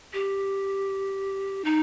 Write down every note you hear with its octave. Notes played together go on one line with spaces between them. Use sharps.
G4
D#4